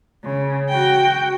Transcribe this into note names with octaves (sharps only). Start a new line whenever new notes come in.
C#3
F#4 G5